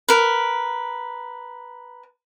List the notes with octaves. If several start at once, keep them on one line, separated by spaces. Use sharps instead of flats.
A#4 B4